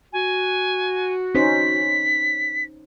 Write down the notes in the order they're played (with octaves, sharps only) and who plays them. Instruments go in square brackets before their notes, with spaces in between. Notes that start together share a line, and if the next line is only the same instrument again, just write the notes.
[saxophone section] F#4 [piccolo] G#5
[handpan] C#4 D#4 C5 [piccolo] B6